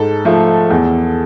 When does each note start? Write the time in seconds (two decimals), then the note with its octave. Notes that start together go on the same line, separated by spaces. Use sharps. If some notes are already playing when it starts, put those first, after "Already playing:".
Already playing: G#2 A4
0.25 F3 A3
0.70 E2